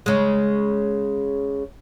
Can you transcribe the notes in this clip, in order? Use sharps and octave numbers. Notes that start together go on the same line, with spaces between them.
C#3 G#3